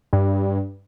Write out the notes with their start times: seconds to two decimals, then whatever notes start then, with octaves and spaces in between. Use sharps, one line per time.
0.13 G2